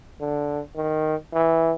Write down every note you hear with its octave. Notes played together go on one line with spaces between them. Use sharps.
D3
D#3
E3